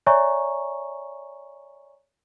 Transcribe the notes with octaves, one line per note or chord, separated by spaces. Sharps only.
C#5 D5 E5 G#5 A#5 C#6